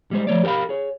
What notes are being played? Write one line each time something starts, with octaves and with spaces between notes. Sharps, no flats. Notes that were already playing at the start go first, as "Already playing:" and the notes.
G3 G#3 C5
F3 A3 C#5 D5
G4 A#4 C#5 F5 B5
G#4 C#5